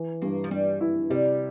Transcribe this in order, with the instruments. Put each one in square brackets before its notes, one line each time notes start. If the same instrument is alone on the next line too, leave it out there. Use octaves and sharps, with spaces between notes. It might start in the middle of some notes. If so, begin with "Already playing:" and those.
Already playing: [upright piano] E3
[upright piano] G2 [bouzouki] A#3
[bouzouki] F3
[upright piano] G2 [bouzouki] G3
[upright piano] E4
[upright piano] C3 [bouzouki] G3